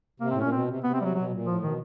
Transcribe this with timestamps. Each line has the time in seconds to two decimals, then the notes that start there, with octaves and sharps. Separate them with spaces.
0.20 C3 A#3
0.31 A2 C4
0.41 A#2 C#4
0.52 B2 C4
0.68 C3
0.83 C3 B3
0.94 C4
1.01 G3
1.05 F#3
1.15 B2 F#3
1.31 A#2
1.46 A2 F3
1.63 B2 D#3